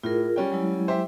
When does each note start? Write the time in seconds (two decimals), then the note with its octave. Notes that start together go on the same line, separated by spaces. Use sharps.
0.03 A2 F4 G#4 A#4
0.36 G3 C#4 G5
0.52 F#3 G#3 E4
0.88 G4 C5 E5